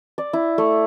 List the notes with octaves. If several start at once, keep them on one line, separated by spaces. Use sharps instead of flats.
D5
E4
A3